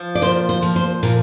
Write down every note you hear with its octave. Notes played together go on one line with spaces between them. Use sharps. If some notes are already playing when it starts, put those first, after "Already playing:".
Already playing: F3
D5
A#2 C5
C5
F3
C5
A#2 A#4